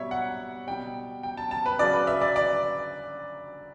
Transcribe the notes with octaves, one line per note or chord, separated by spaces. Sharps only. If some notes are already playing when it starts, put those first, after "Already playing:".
Already playing: B2 G3 C#5 E5
F#5
B2 G3 G5
G5
A5
A5
B4
C#3 F#3 D5
B4
E5
D5
D5